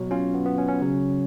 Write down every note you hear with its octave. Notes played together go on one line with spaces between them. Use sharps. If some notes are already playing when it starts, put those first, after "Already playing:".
Already playing: B2 F#3
C#4 F4
B3
B3
C#4
C#4
C#3 F#3